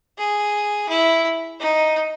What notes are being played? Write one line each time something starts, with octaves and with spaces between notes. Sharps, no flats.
G#4
E4
D#4